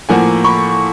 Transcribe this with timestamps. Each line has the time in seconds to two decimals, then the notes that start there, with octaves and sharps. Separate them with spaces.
0.09 A2 F3 A#3 F#5 G#5
0.44 B5 C#6